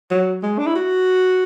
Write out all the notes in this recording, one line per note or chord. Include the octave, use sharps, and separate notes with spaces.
F#3
G#3
D4
E4
F#4